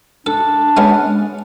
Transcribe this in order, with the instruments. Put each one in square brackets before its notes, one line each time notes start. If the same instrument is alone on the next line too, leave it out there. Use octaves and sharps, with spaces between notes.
[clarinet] D4 [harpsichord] A4
[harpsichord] G#3 B3 C#4